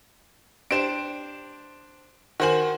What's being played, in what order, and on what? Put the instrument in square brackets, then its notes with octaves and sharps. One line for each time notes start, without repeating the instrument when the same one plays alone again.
[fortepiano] D4 G4 C5 [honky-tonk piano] D7 E7
[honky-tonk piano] D#3 F#7 [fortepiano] F#4 C5 G#5